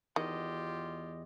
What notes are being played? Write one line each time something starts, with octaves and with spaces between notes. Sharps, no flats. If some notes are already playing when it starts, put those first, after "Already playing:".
E2 D#3 F4 G4 D#5